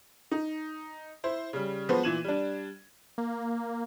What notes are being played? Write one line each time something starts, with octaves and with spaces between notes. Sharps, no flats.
D#4
E4 C5
C#3 G3
F3 G#3 B3 F#4 B4 C5
A#2 E3 G#6 D#7 E7 F#7
G3 D4
A#3